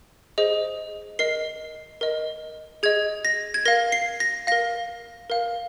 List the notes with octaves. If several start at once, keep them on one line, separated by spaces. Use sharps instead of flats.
G#4 C5 D#5
A#4 D#5 C7
A#4 D#5
G#4 D#5 G#6
A#6
G#6
A#4 F5 A#6
C7
A#6
A#4 F5 A#6
A#4 F5